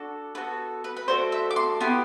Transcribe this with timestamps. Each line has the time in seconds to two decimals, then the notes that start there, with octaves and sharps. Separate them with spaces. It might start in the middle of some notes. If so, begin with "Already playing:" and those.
Already playing: D4 F#4 A4
0.35 B3 F#4 A4 B4
0.84 B4
0.97 B4
1.08 A3 D4 F#4 A4 C5
1.32 E5
1.51 D6
1.56 C6
1.80 B3 E4 G4 C6